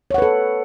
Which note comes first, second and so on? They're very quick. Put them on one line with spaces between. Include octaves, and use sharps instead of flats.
C#5 F#5 B4 A4